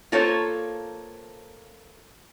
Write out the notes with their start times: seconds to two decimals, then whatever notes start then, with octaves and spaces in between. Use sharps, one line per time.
0.12 A#3 F4 A4 C5 C#5